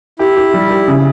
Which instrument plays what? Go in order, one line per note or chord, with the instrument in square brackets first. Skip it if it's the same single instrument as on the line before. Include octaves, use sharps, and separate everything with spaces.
[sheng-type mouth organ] E4 [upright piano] G4
[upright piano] G4
G3
G4
C#3